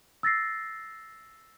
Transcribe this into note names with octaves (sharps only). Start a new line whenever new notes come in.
E6 A6 A#6 C7